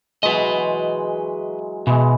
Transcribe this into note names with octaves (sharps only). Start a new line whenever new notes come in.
E3 F#3 G#3 B4 D#5
B2 E3 G#3